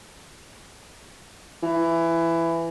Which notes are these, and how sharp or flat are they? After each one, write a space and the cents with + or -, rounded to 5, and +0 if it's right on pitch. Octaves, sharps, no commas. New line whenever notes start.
E3 +15